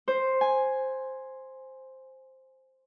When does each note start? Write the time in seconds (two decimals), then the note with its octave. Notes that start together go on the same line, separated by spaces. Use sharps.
0.08 C5
0.41 G#5